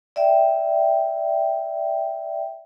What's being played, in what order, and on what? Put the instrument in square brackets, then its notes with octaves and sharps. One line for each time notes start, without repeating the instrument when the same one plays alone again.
[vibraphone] D5 E5 G5